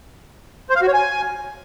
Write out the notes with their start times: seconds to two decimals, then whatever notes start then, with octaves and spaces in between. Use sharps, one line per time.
0.70 C5
0.76 F5
0.82 F#4
0.88 C#5
0.94 G#5